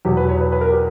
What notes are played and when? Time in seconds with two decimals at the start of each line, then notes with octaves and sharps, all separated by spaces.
0.05 E2 B2 F#3 G4
0.17 B4
0.29 C#5
0.41 B4
0.52 B4
0.61 A#4
0.70 G4